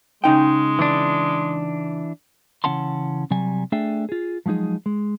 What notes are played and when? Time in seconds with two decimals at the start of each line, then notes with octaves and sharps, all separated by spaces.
0.24 C#3 G#3 D#4 G5
0.79 E3 D4
2.64 C#3 E3 C#4 F#5 A5 C6
3.31 C3 F#3 G3 G#5
3.72 A3 D4 G#4 E5 G5
4.09 F4 G#4
4.46 F3 F#3 G#3 D#4 G#4
4.86 G#3